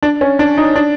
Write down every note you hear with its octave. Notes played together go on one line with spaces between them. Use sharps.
D4
C#4
D4
D#4
D4